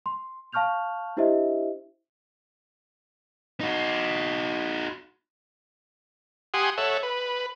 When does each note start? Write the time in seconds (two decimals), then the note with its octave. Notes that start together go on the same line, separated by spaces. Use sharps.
0.06 C6
0.53 F5 A5 C#6 F6 G6 F7
1.17 D4 E4 G4 C5 D#5 E5
3.60 D#4 F#4
6.54 G4 F#5 G#5 C6 D#6
6.78 A4 C#5 E5 F#5
7.03 B4